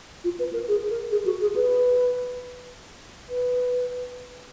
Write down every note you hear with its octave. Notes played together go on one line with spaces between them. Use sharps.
F4
B4
A#4
G#4
A#4
G#4
F#4
G#4
B4
B4